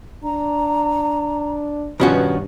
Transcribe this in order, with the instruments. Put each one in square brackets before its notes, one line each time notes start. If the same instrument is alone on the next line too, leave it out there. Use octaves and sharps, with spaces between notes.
[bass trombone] D4 [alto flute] A#5
[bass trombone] G2 [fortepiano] B2 F3 [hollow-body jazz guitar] D#3 C#4 F#4 [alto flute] B4